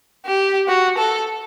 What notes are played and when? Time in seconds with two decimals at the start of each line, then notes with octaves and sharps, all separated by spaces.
0.26 G4
0.68 F#4
0.98 A4